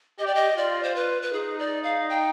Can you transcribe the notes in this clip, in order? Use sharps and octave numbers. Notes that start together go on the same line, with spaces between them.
G4 D#5
D5
D#5
F4 D5
C5
B4
B4
D#4 G#4
D5
F5
G5